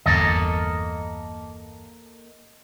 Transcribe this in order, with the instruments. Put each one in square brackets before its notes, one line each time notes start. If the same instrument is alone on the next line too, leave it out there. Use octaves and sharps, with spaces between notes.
[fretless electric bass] G1 E2 D3 [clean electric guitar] A#3 A4 D#5